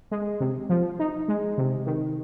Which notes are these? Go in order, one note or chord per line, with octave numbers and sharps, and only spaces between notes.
G#3
C3
F3
D#4
G#3
C3
D#3